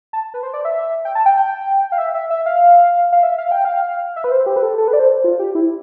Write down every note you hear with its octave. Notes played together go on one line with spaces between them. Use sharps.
A5
B4
C5
D5
E5
G5
A5
G5
G5
F5
E5
E5
E5
F5
F5
E5
F5
G5
F5
E5
B4
C5
G4
B4
A4
A4
B4
D5
C5
F4
G4
E4